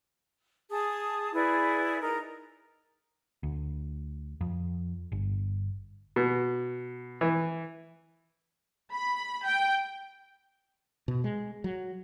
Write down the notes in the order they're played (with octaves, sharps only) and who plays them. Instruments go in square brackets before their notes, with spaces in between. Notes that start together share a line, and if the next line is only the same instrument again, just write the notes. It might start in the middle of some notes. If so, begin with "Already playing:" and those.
[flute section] G#4 A5 D#6
E4 G#4 B4 D5
D#4 A#4 A#5
[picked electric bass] D2
F2
G1
[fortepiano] B2
E3
[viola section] B5
G5
[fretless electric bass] B2
G#3
F#3